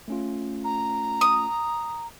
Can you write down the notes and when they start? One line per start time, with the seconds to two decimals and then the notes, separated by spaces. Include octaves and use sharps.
0.08 A3 C#4 F4
0.64 A#5
1.21 D#6